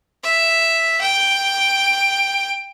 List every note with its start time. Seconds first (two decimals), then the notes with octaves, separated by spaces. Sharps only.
0.24 E5
1.02 G5